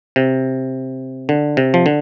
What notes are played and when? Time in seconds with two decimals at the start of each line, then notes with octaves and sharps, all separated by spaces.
0.16 C3
1.29 D3
1.57 C3
1.74 F3
1.86 D3